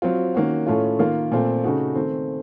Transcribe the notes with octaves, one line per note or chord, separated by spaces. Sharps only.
F#3 C4 F4
D#3 A#3 C#4 F#4
A2 A3 C#4 F4
D#3 A#3 F4
A#2 A3 C4 F4
C#3 A3 D#4 F#4
D#3 A3 C4